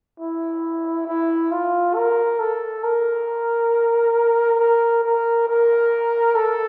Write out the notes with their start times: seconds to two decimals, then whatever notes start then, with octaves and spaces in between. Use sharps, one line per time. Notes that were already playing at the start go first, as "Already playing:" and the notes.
0.20 E4
1.08 E4
1.52 F4
1.96 A#4
2.39 A4
2.84 A#4
4.59 A#4
5.04 A#4
5.47 A#4
6.35 A4